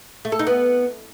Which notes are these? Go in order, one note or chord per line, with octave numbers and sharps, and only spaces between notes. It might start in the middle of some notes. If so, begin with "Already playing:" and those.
A3
A4
D#4
B3